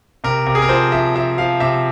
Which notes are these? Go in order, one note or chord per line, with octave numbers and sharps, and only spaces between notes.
C3 A#4
C3 A#4
G#4
A#4
F3 C5
F3 E5
F3 E5
F3 F5
C3 E5